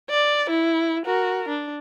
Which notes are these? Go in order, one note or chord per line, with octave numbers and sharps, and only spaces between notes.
D5
E4
F#4 A#4
D4